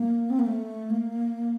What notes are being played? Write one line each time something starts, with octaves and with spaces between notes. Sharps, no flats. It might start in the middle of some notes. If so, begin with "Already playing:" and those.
Already playing: A#3
C4
A#3
A3
A#3